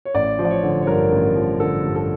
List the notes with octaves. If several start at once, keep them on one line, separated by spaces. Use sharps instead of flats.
C#5
A1 D5
F3
D5
C#5
D3
C#5
G2 A#4
A1
F3
D3 A4
G2
A4